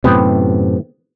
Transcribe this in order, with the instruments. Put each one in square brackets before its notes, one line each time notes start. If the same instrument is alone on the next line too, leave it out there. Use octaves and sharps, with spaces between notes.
[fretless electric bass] F#2 A2 C3 [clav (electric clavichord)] B3 G4 C5